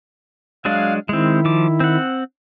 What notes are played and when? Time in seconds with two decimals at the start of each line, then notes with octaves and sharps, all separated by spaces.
0.65 F#3 G#3 D4 F5
1.09 D#3 G#3 C4 E4
1.45 F3 D6
1.80 C4 F#5